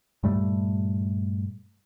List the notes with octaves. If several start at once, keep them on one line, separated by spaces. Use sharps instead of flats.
G2 A#2 G3 A3